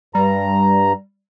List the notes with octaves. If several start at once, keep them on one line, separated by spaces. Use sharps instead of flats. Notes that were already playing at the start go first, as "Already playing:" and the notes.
G2 G3 A#5